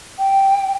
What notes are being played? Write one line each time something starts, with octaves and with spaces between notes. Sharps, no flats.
G5